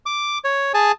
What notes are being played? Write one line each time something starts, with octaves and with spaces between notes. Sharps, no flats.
D6
C#5
G#4 G#5 A5